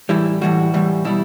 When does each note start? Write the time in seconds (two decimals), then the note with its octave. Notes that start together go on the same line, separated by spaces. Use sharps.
0.09 A2 E3 G3 E4
0.41 A2 E3 G3 F#4
0.74 A2 E3 G3
1.05 B2 G3 E4